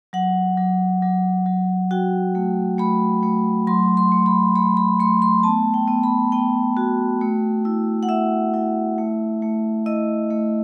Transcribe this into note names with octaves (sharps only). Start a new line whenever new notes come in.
F#3 F#5
F#3
F#3
F#3
F#4 G5
A3
A3 B5
A3
F#3 C6
C6
A3
B5
A3 B5
B5
A3 C6
C6
B3 A5
G5
B3
B5
B3 G5
F#4
A3
E4
F#5
E4 E5
E4
A3
A3
E4 D#5
A3